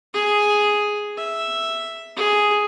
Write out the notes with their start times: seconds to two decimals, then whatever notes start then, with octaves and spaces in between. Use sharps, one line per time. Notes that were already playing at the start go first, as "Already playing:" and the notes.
0.14 G#4
1.17 E5
2.16 G#4